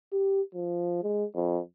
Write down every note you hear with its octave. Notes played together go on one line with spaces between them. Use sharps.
G4
F3
G#3
F2